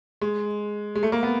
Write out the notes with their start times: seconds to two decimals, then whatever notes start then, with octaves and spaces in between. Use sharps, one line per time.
0.21 G#3
0.95 G#3
1.03 A3
1.12 A#3
1.23 B3